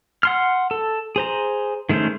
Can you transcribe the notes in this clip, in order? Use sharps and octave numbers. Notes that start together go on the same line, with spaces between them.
F#5 C6 F6
A4
G#4 C5 A#5
D#3 G#3 A3 C#4 C5